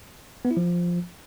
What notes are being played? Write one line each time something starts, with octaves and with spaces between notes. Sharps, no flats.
B3
E4
F3